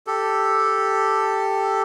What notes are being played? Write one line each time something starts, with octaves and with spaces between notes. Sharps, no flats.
G4 A4